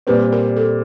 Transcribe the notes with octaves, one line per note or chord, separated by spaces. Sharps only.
A#2 G3 C4 B4
A#4
A4